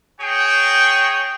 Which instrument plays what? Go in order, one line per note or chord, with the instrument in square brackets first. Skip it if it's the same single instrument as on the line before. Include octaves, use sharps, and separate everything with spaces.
[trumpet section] F#4 G#4 C#5 G5